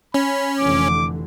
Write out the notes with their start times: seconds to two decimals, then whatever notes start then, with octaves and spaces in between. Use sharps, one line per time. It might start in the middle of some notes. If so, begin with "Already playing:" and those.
0.14 C#4 B5
0.59 F1 D3 E3 D6